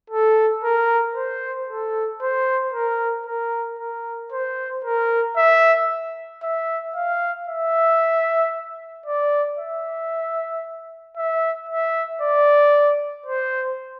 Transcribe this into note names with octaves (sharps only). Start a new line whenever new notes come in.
A4
A#4
C5
A4
C5
A#4
A#4
A#4
C5
A#4
E5
E5
F5
E5
D5
E5
E5
E5
D5
C5